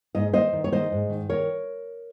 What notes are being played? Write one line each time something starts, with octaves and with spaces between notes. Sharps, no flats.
G#2 D#5
D#3 C5 D#5
D#3
C#5
D#3 C5 D#5
G#2
D#3
D#3 A#4 C#5